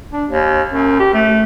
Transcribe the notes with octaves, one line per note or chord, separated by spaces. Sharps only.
D4
D#2
F#2
G4
A3